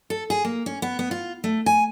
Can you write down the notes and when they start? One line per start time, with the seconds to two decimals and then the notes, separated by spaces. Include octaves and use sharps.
0.10 A4
0.30 G#4
0.45 A#3
0.66 C#4
0.82 B3
0.99 B3
1.11 F4
1.44 A3
1.66 G#5